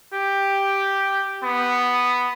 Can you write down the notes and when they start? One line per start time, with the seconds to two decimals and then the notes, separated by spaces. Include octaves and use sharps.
0.13 G4
1.43 B3